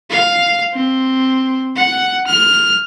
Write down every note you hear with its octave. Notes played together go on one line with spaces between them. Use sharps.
F5
C4
F#5
F6